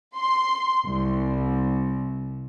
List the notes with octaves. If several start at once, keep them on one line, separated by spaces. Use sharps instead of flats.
C6
C2